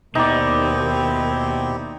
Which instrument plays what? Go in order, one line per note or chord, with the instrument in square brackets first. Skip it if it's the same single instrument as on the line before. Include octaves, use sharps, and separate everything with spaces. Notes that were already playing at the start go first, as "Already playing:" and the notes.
[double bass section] D#2 [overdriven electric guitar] B2 [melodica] C4 E4 G4 [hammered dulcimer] D#4 D5